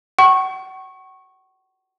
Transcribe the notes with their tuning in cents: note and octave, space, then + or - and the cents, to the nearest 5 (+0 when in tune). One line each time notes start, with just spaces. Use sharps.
F#5 +40 C#6 -15